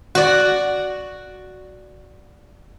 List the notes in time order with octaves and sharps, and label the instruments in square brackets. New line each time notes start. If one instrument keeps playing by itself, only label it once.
[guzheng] F#4 D5